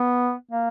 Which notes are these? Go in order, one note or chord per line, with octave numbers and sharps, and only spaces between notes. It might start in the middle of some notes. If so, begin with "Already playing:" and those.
Already playing: B3
A#3